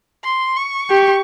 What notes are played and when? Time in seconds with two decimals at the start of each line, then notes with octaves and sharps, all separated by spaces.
0.24 C6
0.57 C#6
0.90 G4